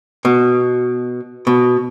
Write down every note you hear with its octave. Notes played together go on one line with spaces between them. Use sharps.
B2
B2